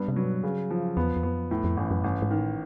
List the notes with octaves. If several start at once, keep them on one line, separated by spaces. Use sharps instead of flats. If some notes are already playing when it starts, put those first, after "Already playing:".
Already playing: G2 B3
C3
F#3
B2
C#3
F3
E2 B3
E2
F2 B3
E2 A2
F2
A1 G2
F#2
A1 G2
G#2
D#3
A2